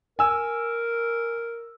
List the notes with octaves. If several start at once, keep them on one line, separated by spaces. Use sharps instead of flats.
A#4 G#5 E6